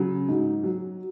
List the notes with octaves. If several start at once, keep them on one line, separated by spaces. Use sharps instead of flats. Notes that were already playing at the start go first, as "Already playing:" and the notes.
Already playing: C#3 F#3
G#2
F#3